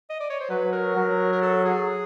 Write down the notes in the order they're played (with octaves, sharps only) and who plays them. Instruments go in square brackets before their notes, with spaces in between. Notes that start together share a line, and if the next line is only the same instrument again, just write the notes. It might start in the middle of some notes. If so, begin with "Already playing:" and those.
[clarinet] D#5
D5
C#5
C5
[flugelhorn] F#3 [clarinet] B4
[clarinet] A#4
[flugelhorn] F#3
[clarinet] A#4
A4
G#4